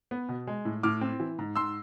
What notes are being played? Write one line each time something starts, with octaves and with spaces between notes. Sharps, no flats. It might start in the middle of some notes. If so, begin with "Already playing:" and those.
B3
B2
G#3
A2
A2 D6 F6
C4
E3
G#2
G#2 C6 E6